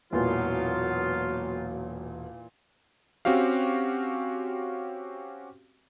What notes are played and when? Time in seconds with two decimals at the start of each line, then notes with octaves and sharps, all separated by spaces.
0.13 E1 A#2 E3 F#3 B3 F4
3.25 C4 C#4 F#4 G4 F5